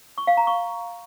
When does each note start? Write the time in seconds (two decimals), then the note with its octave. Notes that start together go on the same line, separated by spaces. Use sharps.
0.18 C#6
0.27 F5
0.37 A#5
0.47 C#6